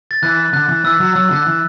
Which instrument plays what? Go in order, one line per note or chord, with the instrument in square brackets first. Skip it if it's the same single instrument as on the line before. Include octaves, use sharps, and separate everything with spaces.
[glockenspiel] A6
[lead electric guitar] E3 [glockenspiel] F#6
[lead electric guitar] D3 [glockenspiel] F#6
[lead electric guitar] E3
[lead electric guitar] E3 [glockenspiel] E6
[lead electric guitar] F#3
[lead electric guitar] F#3 [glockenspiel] E6
[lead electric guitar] D3
[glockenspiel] F#6
[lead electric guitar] E3